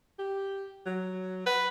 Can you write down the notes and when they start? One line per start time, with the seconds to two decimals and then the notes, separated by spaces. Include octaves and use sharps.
0.18 G4
0.86 F#3
1.46 B4 F#5